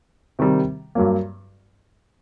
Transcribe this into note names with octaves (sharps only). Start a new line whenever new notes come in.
C3 D#3 G3
G2 F#3 A#3